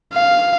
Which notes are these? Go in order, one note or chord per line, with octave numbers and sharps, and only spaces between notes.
F5